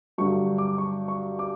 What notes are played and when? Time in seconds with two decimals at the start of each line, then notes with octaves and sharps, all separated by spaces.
0.18 G2 D3 F#3 C#6
0.58 D6
0.78 C#6
1.08 C#6
1.39 D6